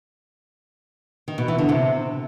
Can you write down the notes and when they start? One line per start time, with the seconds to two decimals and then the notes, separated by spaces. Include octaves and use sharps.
1.28 D#3
1.38 B2
1.48 E3
1.58 D3
1.69 C3